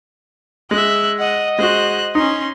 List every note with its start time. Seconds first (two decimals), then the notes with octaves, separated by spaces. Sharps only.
0.71 G#3 E5 F#6
1.19 D#5 F#5
1.59 G#3 F#4 C5 F#6
2.15 C#4 D#4 C6